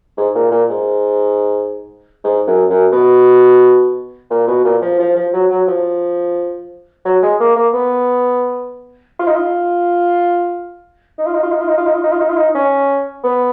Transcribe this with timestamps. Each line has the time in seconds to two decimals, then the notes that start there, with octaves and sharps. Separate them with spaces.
0.17 G#2
0.35 A#2
0.51 A#2
0.70 G#2
2.24 G#2
2.47 F#2
2.69 F#2
2.92 B2
4.31 A#2
4.47 B2
4.64 A#2
4.82 F3
4.99 F3
5.16 F3
5.33 F#3
5.50 F#3
5.68 F3
7.05 F#3
7.23 G#3
7.40 A#3
7.56 A#3
7.73 B3
9.19 F4
9.27 D#4
9.36 F4
11.18 D#4
11.26 F4
11.35 D#4
11.43 F4
11.52 D#4
11.61 F4
11.68 D#4
11.78 F4
11.86 D#4
11.95 F4
12.04 D#4
12.12 F4
12.20 D#4
12.30 F4
12.37 D#4
12.55 C#4
13.24 B3